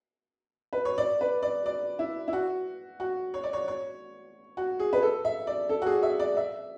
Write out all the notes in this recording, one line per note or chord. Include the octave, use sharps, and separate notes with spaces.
B4
C#5
D5
B4
D5
D5
E4
E4
F#4
F#4
C#5
D5
C#5
C#5
F#4
G#4
B4
A4
E5
D5
A4
F#4
G#4
E5
D5
E5